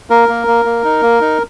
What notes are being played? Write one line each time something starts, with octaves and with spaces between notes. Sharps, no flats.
A#3 A#4
A#3
A#3
A#3
D#4
A#3
D#4